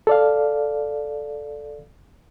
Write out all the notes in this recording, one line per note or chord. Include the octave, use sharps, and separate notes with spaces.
A4 D5 F5